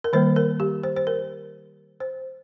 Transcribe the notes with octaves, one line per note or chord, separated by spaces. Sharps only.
A#4
D#3 G3 A#3 C5
A#4
G4
C5
C5
A#4
C5